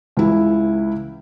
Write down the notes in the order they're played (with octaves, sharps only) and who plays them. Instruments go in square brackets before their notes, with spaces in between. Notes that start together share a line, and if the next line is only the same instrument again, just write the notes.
[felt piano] C#2 E3 E4